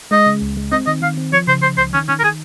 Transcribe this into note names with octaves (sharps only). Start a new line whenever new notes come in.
G#3 D#5
C#3
C#2
G#3
C4 D#5
D#3 D#5
D#3 F5
C4
F3 C#5
C#3 C5
C#3 C5
C#2 C5
D#3 C#4
D#3 C#4
A#4
D#3 G#4